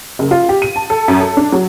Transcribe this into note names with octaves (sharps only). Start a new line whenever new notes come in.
F#1
F4
G4
D#7
A5
A4
F#2
A4
D4
F#3